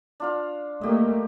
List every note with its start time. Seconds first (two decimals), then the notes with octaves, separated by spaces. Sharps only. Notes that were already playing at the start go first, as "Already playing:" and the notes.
0.20 D4 F4 F5
0.81 A3 A#3 G4 D#5